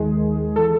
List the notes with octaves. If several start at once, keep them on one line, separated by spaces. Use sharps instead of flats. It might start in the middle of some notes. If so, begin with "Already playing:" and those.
Already playing: D#2 D#3 G#3 G#4
E3 A4